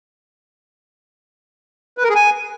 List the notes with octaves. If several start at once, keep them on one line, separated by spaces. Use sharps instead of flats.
B4
A#4
G#4
G#5